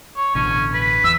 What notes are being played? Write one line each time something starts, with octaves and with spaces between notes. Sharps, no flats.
C#5
A1 B2 D3 C#4
B4
E2 E6